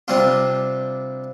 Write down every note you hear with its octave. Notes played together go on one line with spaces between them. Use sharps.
C3 G3 D4 F4